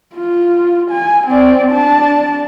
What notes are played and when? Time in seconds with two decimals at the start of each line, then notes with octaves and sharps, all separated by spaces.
0.15 F4
0.91 G#5
1.27 C4 D5
1.72 D4 A5